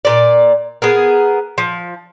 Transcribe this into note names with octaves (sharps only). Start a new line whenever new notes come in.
A#2 D5
B3 G#4 A#4
F3